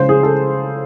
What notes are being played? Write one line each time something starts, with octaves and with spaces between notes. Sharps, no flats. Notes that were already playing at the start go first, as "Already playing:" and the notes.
Already playing: C#3 F3 G#3 C5
G#4
A4